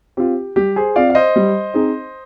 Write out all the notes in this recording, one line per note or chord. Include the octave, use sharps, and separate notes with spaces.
C4 F4 G4
G3 G4
G#4 C5
C4 F4 D5 F5
F5
C5 D#5
G3
C4 D#4 G#4